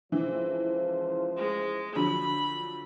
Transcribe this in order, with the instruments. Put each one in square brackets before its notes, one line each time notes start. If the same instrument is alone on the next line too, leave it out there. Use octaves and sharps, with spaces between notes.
[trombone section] C#2 F3 C5 [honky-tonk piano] E3
[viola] G#3
[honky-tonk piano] D3 F3 F#3 [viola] B5